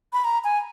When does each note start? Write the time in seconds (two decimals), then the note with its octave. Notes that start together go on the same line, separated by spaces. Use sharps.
0.13 B5
0.24 A#5
0.44 G#5